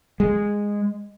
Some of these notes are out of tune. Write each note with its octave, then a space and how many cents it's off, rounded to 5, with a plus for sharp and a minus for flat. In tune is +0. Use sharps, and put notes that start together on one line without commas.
G#3 -10